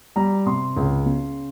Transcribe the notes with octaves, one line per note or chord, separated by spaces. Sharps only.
G3 A#5
C3 C6
C#2
C#3